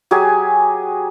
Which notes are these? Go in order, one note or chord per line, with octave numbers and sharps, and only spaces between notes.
F#3 G4 G#4 G#5